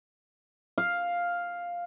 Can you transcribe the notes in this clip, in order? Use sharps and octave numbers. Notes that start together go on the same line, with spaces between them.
F5